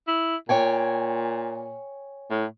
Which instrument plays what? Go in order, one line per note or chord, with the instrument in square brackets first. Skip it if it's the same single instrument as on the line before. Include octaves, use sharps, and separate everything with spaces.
[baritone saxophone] E4
[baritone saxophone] A#2 [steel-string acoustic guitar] C#5 G5 G#5
[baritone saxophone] A2